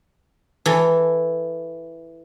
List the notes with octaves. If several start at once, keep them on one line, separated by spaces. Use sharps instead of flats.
E3 A4